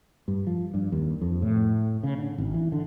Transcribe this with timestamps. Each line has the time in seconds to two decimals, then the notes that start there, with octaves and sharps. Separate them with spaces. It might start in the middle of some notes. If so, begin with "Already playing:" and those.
0.28 G2
0.47 F3
0.74 G2
0.92 D#2
1.21 F2
1.42 A2
2.03 C#3
2.18 D3
2.38 G#1
2.54 E3
2.72 D3